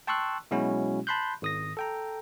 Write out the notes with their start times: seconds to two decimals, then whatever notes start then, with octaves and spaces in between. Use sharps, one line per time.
0.07 G5 A5 C6 C#6 E6 F#6
0.51 B2 F#3 G#3 C#4 E4 F#4
1.07 A5 B5 C6 F#6 G6
1.42 G#1 D#6 A#6
1.77 A4 G5 A#5